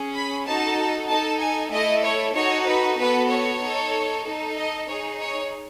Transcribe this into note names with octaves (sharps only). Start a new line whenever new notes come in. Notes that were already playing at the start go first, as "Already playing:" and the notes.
Already playing: C#4 G#4
B5
D#4 F#4 A4 A5
D#4 A4 A5
G#5
A3 E4 A4 D#5
C#5
D#4 F#4 A4 C#5
B4
B3 F#4 A4 B4
C#5
D#4 A4
D#4 A4
D#5
D#4 G#4 C#5
C#5